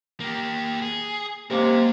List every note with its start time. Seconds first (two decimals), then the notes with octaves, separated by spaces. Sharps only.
0.20 A#3 G4
0.82 G#4
1.50 C3 G#3 A#3 C#4 A#4